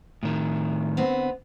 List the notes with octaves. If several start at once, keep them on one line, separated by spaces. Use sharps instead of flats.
A2 D#3
D3 B3 C4